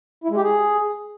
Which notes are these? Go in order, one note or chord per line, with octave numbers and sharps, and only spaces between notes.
E4
G#3
G4
G#4